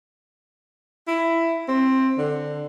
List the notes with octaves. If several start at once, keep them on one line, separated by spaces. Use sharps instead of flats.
E4
C4
D3